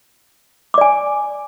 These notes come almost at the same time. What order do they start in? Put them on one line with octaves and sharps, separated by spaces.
D6 D5 G#5